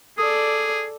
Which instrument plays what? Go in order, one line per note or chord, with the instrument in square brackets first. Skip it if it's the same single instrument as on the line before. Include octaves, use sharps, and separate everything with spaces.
[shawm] G#4 [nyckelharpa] A4 D5 [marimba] D#6